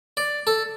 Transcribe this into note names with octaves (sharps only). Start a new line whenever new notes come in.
D5
A4